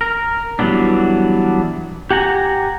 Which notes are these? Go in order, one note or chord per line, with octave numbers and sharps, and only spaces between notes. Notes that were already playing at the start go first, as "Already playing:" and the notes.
A#4
E3 F#3 G3 B3 D4
G4 F#5 G#5 A#5